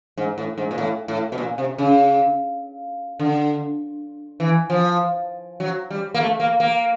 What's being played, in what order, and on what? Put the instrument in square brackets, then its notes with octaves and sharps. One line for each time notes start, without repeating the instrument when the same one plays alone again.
[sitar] G#2
A2
G#2
A#2
A2
A2
B2
A#2
C3
C#3
D3
E3
F3
F#3
G3
A#3
A3
A#3
A#3